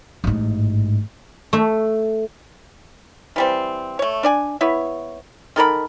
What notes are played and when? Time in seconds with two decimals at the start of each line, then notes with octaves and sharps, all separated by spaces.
0.24 A1 G#2
1.53 A3
3.36 E3 G3 C4
3.99 A3 C#5
4.23 D4 D5 G#5
4.61 B3 E4 B4 C#5
5.56 D#3 A4 A#4 B5